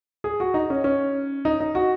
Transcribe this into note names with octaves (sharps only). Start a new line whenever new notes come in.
G#4
F#4
D#4
C#4
C#4
D#4
D#4
F#4